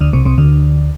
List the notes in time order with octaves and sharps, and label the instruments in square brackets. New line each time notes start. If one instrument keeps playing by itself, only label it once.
[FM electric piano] D2 D3
C2 C3
C2 C3
D2 D3